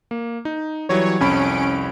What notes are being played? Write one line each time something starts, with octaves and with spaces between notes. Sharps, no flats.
A#3
D#4
E3 F#3 G3 C#5
C2 F2 C#4 B5 D7